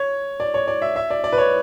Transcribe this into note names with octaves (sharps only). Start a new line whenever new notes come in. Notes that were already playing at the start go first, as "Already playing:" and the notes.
Already playing: C#5
D5
C#5
D5
E5
E5
D5
D5
B4
C#5